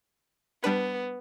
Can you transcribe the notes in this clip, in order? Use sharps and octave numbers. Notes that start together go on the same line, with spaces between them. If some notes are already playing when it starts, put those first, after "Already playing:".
G3 B3 D4 B4